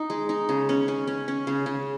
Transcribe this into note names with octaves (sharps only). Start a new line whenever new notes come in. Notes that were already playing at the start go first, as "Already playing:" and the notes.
Already playing: D#4
G#3
D#4
C#3
C#4
C#4
C#4
C#4
C#3
C#3